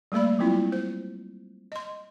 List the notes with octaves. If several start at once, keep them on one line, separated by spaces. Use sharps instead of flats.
G3 A3 A#3 D5 B5
F#3 G3 C4 E4 F4
C5
D#5 C6